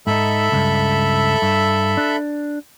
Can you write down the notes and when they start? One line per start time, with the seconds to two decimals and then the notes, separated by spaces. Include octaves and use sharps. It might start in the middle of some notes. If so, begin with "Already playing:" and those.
0.07 G#2 D#4 A4 E5 B5
0.52 C#2 G2
1.42 G2
1.97 D4